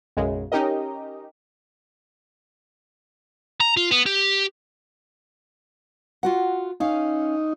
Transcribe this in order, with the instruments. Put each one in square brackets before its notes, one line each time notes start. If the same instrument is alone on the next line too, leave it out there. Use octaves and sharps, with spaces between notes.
[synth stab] B1 F#2 C#3 G#3
C#4 D#4 G4 A#4 D#5
[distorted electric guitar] A#5
F4
B3
G4
[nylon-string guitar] F4 F#4 F#5
[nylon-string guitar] C#4 F5 [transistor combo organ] D#4